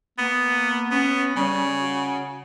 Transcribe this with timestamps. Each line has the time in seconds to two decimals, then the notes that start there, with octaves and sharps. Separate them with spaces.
0.18 A#3 B3
0.91 B3 C#4
1.36 C#3 G3
1.79 F#4